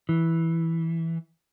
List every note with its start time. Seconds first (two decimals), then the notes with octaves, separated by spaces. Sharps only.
0.09 E3